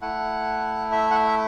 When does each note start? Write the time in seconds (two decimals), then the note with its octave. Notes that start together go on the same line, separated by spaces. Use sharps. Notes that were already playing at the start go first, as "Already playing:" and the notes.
0.02 A3 E4 F#5
0.92 E5
1.11 F#5
1.15 E5